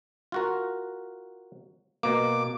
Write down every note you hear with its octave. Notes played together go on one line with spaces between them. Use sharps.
F4 F#4 A#4
B2 A#3 D6